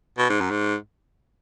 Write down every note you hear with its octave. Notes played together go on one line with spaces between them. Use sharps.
B2
G#2
F#2
G#2